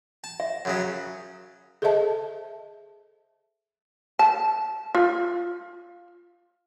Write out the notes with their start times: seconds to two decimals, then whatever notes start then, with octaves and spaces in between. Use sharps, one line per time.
0.24 A5
0.40 E5
0.65 F#2 C#3 F#3
1.82 G#4 A4 C5 D#5 E5 A5
4.19 A5
4.95 F4